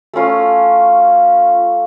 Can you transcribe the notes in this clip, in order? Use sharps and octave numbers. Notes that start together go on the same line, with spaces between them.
A3 C#4 F4